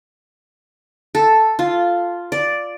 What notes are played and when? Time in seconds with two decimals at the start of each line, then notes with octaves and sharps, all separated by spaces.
1.15 A4
1.59 F4
2.32 D5